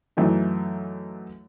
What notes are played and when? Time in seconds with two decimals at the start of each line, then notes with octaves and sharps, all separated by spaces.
0.17 F#2 E3 A3 D#4